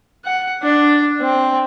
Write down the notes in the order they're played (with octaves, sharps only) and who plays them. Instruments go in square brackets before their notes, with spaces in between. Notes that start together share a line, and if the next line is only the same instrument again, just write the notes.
[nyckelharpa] F#5
D4
C4